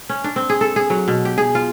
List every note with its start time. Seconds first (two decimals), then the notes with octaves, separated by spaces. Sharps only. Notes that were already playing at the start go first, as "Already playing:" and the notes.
0.09 C#4
0.24 D4
0.36 C4
0.50 G#4
0.61 A4
0.76 G#4
0.90 F#3
1.08 B2
1.25 G4
1.38 G#4
1.55 F4